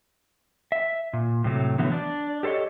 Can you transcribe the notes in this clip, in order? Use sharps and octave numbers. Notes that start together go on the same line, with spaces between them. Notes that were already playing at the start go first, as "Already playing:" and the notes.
E5
A#2
A2 C3 F#3 A3
D3 E3 F#3 A3 B3
D4 D5
G4 A4 C5 C#5 D#5